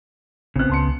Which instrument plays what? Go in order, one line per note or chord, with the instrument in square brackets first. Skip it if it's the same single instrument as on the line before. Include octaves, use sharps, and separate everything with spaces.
[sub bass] A1 [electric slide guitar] C#3 B3 [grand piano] C4 F#6
[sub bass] C#2 [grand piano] A5 C6 C#7